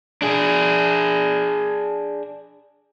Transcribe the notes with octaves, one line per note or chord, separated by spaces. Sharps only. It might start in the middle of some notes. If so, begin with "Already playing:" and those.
D4 G#4